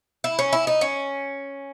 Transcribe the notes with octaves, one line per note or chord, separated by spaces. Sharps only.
E4
C#4
E4
D#4
C#4